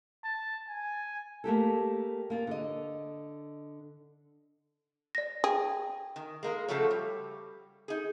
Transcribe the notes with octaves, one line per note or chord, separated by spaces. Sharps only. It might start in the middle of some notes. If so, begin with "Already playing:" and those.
A5
G#5
A3 A#3 G4 A4
A#3 F4 G#4
D3 D#5
D5 A#6
G#4 G5
D#3
G#3 A#3 A#4
C#3 F3 F#3 A3 A4 C#5
G3
D#4 G#4